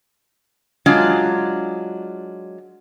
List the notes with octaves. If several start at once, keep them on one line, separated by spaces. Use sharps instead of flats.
F#3 G#3 D4 F4